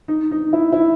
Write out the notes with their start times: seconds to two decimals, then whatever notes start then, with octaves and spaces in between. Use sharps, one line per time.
0.08 D#4
0.31 D#4
0.53 E4
0.72 E4